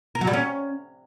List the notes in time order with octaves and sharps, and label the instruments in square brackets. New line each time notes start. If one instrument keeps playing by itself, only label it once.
[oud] A#4
F#3
G3
C#4